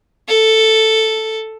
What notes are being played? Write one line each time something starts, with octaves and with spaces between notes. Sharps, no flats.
A4